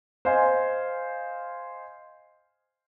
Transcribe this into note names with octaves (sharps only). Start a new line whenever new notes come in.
C5 D#5 F5 G#5